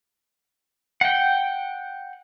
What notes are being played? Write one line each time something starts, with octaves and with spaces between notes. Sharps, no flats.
F#5 G5